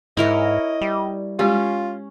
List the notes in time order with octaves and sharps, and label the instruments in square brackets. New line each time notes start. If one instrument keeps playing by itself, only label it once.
[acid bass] G#2 [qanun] E4 A#4 C#5 [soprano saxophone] D#5
[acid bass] G3
[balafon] G#3 G4 [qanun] C#4 [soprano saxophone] F4